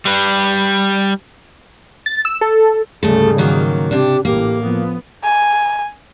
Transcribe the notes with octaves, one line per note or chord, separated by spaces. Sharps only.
G3 B4
A6
E6
A4
D2 G#2 C#3 G3 A3 G#4 A4
D#3 F#3 A#3
C3 D4 G4
A1 A2 A#3 G4
F3 B3
G#5